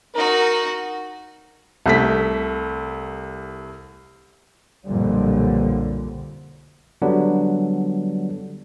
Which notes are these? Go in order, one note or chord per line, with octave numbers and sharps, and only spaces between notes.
D#4 F#4 A#4
C2 A3 B6
B1 F2 A#2 D3 G3
D3 F#3 G3 B3 D4